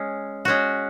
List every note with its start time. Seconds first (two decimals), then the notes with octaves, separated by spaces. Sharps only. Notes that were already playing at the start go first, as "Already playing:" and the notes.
Already playing: G#3 C#4
0.45 G#3 C#4 F#4